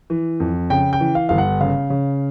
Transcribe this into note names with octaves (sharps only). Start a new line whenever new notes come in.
E3
F2
C#3 G5
G5
E3
F5
G1 F5
F#5
C#3 F5
C#3